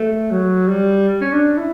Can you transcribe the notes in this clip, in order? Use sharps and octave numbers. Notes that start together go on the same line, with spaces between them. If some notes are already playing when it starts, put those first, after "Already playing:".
Already playing: A3
F#3
G3
C#4
D4
E4